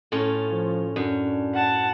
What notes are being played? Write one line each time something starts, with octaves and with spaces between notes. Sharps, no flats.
A2 C#4 F4
F3
F#2 D4
F#5 A5